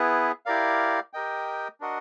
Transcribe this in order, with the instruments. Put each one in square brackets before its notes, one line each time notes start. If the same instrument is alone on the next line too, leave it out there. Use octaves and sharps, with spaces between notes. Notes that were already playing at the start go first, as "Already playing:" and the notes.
Already playing: [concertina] B3 E4 G#4 B4
E4 G4 A#4 D5 F5
G4 A#4 D#5 G5
D4 F#4 A#4 D#5 F#5